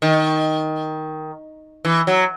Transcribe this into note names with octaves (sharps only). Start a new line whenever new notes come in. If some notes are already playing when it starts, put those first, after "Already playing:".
D#3
E3
F#3